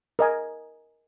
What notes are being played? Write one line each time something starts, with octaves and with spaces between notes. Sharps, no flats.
A#4 D#5 G#5